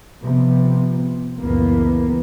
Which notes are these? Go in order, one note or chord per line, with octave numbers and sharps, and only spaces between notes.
C3 F3 B3
C#2 F#2 A#2 E3 A#3 B3